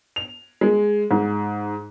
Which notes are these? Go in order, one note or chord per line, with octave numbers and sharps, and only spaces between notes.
F7
G#3
G#2